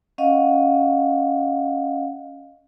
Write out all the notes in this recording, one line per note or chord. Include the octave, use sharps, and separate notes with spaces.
C#4 D#5 F5 F#5